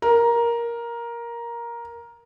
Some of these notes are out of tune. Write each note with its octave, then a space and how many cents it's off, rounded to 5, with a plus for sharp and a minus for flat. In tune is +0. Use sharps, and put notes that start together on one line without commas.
A#4 +10